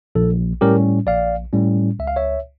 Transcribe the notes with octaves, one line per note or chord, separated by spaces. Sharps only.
A#1 A4
A2 G3 C#4 G4 A#4
A#1 D5 F5
A2 G3 C#4
C#2 E5
F5
C#5 E5